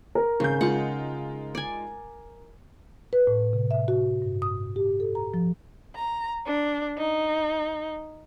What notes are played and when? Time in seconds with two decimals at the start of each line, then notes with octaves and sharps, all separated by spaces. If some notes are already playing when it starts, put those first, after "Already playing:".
0.15 A#4
0.40 G#1 C#3 G6
0.61 G#3 D#4 F4 F#5
1.55 D5 G#5
3.13 B4
3.27 A2
3.53 C3
3.71 E5
3.88 F#4
4.22 G2
4.42 D#6
4.76 G4
5.00 A4
5.15 A#5
5.34 F3
5.95 A#5
6.47 D4
6.97 D#4